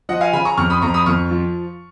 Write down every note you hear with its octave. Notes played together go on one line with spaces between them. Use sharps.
F3 D#5 F#5
F5 G#5
C#3 G#5 B5
A#5 C#6
F2 C#6 F6
B5 D#6
F2 A#5 C#6
B5 D#6
F2 C#6 F6
F3